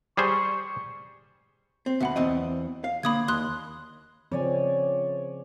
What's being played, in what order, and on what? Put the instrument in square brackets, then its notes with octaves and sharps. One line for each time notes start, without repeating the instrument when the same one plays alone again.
[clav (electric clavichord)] G3 G#4 C5 [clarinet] C#6
[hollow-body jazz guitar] C4
[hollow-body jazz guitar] D2 B2 [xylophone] E5 F#5 B5
[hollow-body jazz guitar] E2 C4 D#5
F5
[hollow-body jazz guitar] D3 A#3 [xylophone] B5 D#6 G#6
[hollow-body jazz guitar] D#2 [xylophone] C6 D#6 F#6
[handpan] C#3 F3 C4 [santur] C#5 D5 G#5